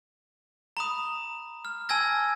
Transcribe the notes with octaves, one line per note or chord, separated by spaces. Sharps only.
A#5 B5 D#6
F6
G#5 A5 E6 G#6 A#6